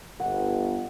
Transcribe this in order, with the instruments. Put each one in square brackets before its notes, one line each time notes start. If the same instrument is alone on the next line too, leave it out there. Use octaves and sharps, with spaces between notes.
[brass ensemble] G1 [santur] F#5